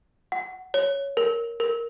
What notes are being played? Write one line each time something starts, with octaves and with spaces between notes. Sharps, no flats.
F#5
C#5
A#4
A#4